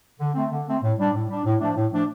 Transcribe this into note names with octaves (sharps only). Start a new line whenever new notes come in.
D3
A3 C4
D3
A3 C4
A2
G3 D4
A2
G3 D4
A2
F3 A3 D4
A2
F3 A3 D4